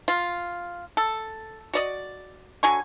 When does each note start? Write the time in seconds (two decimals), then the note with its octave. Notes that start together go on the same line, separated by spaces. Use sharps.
0.08 F4
0.97 A4
1.74 F#4 D5 D#5
2.63 D3 F#3 G#5 C#6